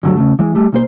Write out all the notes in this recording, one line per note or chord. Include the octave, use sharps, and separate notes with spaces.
D2 G2 D3 F#3 A3
C#3 A3
E3 G#3
G3 A3
B1 A#3 C5